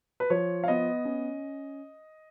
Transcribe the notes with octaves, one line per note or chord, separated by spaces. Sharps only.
B4
F3 C#5
F5
B3 D#5
C#4